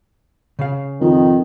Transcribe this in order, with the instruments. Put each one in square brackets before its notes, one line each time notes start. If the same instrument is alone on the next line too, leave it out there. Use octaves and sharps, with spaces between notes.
[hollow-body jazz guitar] C#3 F5
[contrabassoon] F2 [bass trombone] D#3